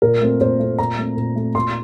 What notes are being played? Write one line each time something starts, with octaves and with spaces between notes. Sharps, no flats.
A#2 A#4
A3 C4
A#2 C5
A3 C4
A#2 A#5
A3 C4
A#2
A3 C4
A#2 C6